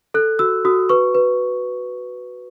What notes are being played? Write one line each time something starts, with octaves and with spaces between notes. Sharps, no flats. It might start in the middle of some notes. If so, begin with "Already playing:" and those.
A4 F#6
F#4 E6
F#4 D#6
B4 C#6
B4